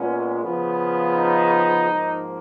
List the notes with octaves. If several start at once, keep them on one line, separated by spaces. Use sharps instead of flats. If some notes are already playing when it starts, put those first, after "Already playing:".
Already playing: A#2 G#3 B3 C#4
C#3 F3 B3
D#4
G#2 F3 A#3